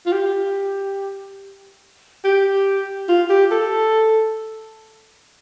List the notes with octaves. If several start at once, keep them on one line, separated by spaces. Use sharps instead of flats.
F4
G4
G4
F4
G4
A4